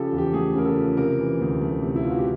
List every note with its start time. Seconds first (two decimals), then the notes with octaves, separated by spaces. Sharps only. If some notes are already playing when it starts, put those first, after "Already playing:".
Already playing: C#3 F3 G4 A4
0.12 E2
0.18 G4
0.33 A3 G#4
0.55 C#3 A#4
0.65 A4
0.77 F3
0.97 C3 A#4
1.19 E3
1.40 D2
1.61 A3
1.82 C3
1.96 E4
2.03 E3 F4
2.10 F#4
2.18 G4